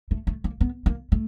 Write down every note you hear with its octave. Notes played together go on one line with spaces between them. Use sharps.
A3
A3
A#3
B3
A#3
A3